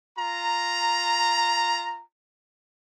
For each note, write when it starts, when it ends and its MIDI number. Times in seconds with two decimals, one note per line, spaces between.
0.18 2.03 65
0.18 2.03 82